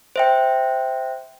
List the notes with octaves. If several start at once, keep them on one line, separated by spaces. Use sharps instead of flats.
C5 E5 G5